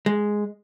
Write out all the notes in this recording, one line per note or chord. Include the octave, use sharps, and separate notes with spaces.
G#3